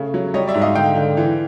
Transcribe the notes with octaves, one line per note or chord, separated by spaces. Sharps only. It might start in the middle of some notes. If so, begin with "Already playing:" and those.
Already playing: C#3 A3
F#3
G3 C#5 D#5
D5 E5
G#2
D#5 F5
D3 F5 G5
D3
E3